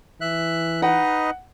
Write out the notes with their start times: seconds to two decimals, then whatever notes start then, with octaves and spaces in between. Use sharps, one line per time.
0.21 E3 E5 F#6
0.82 D#4 B4 D#5 F#5